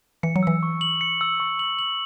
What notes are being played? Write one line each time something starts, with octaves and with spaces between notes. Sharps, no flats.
E3 C#7
F#3
E3 E6
C#6
F#7
C#7
E6
C#6
F#7
F#7